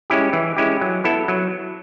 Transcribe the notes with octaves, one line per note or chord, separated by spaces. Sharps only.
G#3 C#4 E4 G4
E3
G#3 C#4 E4 G4
F#3
B3 E4 A4
F#3